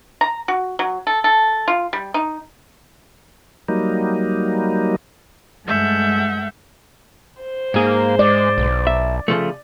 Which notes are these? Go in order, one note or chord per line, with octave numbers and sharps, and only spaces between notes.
A#5
F#4
F#3
A4
A4
F4
G3
D#4
F#3 G3 A#3 D#4
G2 G#3 A3 E5 F#5 G6
C5
G#2 A#3 G#4
G#3 D5
B1
E5
C#3 F3 A3